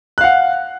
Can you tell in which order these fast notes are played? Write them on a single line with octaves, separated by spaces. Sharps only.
F#6 F5 F#5